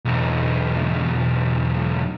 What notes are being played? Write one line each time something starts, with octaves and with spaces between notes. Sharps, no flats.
B1 E2